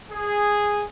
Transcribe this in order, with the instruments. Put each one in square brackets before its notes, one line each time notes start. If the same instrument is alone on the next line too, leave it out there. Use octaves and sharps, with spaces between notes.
[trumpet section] G#4